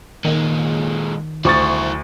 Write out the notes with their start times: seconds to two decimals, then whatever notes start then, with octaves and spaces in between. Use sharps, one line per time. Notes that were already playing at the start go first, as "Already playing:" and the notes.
0.25 A#2 D#3 G#3
1.45 D2 E4 C5 C#6 A6